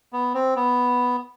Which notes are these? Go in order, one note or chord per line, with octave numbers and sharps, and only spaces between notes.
B3
C4
B3